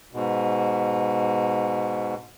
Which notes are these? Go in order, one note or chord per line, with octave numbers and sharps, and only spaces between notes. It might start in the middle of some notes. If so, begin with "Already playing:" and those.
G#2 B2